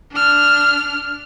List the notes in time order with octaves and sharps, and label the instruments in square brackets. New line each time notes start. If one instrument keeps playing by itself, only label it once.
[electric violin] D4 F6